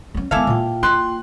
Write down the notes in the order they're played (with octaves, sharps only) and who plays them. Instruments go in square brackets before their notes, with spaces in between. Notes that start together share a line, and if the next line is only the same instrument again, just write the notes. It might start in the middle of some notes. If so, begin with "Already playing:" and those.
[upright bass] F#3 C#4
[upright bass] D#3 B3 [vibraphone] G#3 G#5 D6 [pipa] E4 A4 F5
[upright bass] A#2 [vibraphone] F4 G5
[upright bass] A#3 [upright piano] C6 F#6